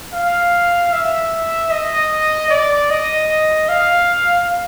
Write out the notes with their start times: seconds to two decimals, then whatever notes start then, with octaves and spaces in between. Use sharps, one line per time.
0.13 F5
0.92 E5
1.71 D#5
2.50 D5
2.90 D#5
3.69 F5